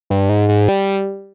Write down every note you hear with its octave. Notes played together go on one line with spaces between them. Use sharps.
G2
G#2
G#2
G3